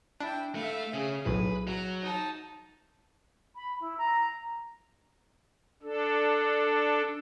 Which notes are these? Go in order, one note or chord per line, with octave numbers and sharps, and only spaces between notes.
D4 E4 G5
A3 E5 F5
C#3 G#4
B1 A2 B4
F#3 A#5
D#4 A5
B5
E4
A#5
D4 A4